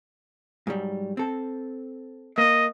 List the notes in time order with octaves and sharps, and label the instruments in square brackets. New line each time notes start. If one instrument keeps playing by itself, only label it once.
[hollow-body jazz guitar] G#2 F#3 G3
C4 A4
[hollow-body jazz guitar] A#3 [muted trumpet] D#5